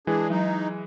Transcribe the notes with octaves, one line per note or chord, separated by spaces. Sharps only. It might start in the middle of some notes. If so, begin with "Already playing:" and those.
E3 G#3 D4 G#4
F#3 D#4